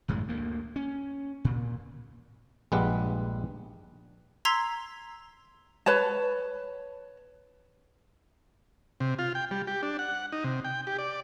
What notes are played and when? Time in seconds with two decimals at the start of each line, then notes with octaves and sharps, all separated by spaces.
0.08 G#1 F#2 A2 G#3
0.28 D2 A#3
0.76 C#4
1.45 A#2
2.72 A#1 G2 G3 G#3 B4 F#5
4.45 A#5 C6 E6 G#6 B6 C7
5.86 B4 C#5 A5
9.00 C3
9.19 F4
9.35 G5
9.51 G3
9.67 G4
9.83 D4
9.99 F#5
10.32 D#4
10.44 C3
10.64 G5
10.87 G4
10.98 D5